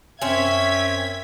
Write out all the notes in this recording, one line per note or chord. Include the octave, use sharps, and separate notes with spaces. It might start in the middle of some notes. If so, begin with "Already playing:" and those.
F#2 C4 C#4 E5 G#6 B6